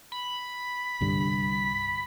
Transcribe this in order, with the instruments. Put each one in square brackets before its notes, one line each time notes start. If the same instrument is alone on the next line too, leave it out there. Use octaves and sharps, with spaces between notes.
[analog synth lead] B5
[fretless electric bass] C2 G2 D3